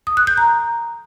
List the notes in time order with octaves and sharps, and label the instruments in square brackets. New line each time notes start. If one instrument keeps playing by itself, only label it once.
[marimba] D#6
F#6
G6
A#5